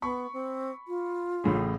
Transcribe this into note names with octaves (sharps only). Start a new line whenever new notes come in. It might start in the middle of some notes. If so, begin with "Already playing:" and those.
B3 B5 C#6
C4
F4
A1 A2 C#3